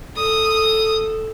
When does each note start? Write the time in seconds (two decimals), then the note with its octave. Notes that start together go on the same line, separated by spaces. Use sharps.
0.17 A4 D#6